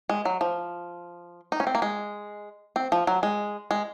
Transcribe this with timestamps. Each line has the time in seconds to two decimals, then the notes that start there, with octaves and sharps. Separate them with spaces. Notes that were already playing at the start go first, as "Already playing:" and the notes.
0.09 G#3
0.25 F#3
0.41 F3
1.52 D#4
1.60 C#4
1.67 C4
1.75 A#3
1.82 G#3
2.76 C4
2.92 F3
3.07 F#3
3.23 G#3
3.71 G#3